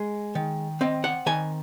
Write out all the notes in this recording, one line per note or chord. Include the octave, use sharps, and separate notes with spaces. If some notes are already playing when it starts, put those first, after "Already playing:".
Already playing: G#3
D#3
C4 D#5
F#5
D#3 G#5